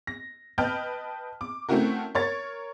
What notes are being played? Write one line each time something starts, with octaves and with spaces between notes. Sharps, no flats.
A#6
B4 D#5 G5 A5 F6 G6
D6
A3 C4 C#4 E4 F#4 A#4
A#4 C#5 A6